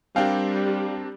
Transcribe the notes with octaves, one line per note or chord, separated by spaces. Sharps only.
G3 C4 D4 A#4 F5 G5